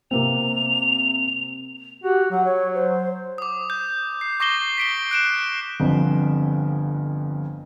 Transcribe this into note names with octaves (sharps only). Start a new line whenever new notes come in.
C3 A#3 C4 F7
F#4 G4
F#3 F#5
C#5
C5
D6 D#6
G6
C7
C#6 D6 A#6 C7 E7 G7
B6 D7 G7
F#6 D7 E7
G1 F2